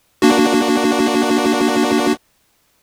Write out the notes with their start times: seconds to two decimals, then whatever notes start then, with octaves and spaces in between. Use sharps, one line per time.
0.22 A#3 D4 F#4